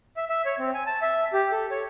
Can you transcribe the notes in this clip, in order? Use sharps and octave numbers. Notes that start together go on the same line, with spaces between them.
E5
E5
C#5
C4
G#5
A5
E5
G4
A4
C#5